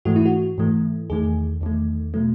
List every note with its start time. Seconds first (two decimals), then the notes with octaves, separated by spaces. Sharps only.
0.05 G#2 E3 A3 F#4
0.16 E4
0.25 F#4
0.58 G#2 E3 A3
1.10 E2 D#3 A3 G#4
1.61 E2 D#3 A3
2.14 B2 F#3 A3